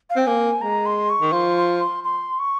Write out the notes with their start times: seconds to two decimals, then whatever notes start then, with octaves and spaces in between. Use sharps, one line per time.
0.10 F5
0.16 C4 G5
0.27 A#3 G#5
0.61 G#3 A#5
0.86 C6
1.10 C#6
1.21 D#3
1.32 F3 C6
1.57 C6
1.80 C6
2.04 C6
2.39 C#6